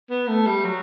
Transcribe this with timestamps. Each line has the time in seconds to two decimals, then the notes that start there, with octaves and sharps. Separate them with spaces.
0.10 B3
0.28 A3
0.46 G3
0.65 F#3